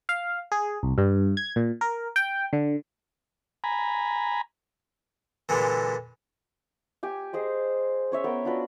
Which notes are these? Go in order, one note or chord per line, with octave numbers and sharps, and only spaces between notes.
F5
G#4
C2
G2
G#6
A#2
A#4
G5
D3
G#5 A#5 B5
A#2 D3 E3 G#3
G4 G#5
G#4 C5 D#5
C#4 C#5 E5
B3 A#4 G5
D4 F4 F#4 B4